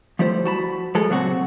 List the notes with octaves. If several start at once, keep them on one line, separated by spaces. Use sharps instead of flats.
F3 G3 A3 E4 C5
F#4 A5 B5
F3 G#3 G#4 A4
C#2 A#2 F#3 C4 F#4